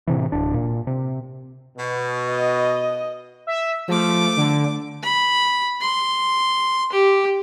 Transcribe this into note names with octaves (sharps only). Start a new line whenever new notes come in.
A2 C3 E3
D1 D4
A#2
C3
B2
D#5
E5
F3 A3 D6
D3
B5
C6
G4